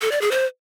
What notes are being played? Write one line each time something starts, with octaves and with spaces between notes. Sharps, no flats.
A4
D5
G#4
C5